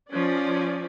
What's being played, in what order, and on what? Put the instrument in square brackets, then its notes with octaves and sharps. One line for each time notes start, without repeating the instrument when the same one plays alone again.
[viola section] F3 C#4 D5